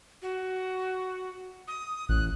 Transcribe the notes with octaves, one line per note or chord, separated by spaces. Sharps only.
F#4
D#6
A1 F#6